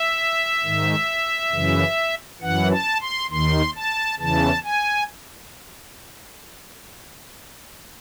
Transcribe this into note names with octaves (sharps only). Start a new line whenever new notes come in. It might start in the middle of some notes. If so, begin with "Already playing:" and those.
Already playing: E5
G#2 D#3
F#2 C#3 E3
F#2 E3 F#5
A5
C6
D#2 D#3 C6
A5
E2 C#3 E3 A5
G#5